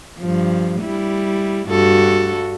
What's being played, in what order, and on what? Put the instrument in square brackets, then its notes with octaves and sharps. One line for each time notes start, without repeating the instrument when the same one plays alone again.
[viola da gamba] G2 F3
G3 E4
G2 F#4 A4